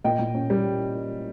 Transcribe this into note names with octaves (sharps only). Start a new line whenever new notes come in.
A#2 D#5 G5
A#2
C#4
G3